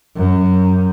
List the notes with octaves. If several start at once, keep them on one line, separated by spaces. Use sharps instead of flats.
F#2